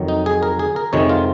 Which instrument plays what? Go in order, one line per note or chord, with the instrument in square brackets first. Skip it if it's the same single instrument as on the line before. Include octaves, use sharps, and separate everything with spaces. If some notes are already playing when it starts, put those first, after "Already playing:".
Already playing: [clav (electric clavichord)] F2 D#3 F#3
D#4
G#4
A#4
G#4
A#4
F2 C3 D#3 G#3 C#5
F4